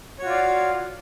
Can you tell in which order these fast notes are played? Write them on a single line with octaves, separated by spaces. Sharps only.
C#5 F#4 F4 D5 F5